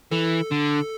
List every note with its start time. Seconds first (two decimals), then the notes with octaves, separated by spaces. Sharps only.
0.11 E3 A4
0.51 D3